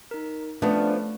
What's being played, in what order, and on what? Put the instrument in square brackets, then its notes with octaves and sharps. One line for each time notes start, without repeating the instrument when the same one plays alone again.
[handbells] D#4 A#4
[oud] F3 B3 [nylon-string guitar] A3 [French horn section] C#4 D4 [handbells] B4 A5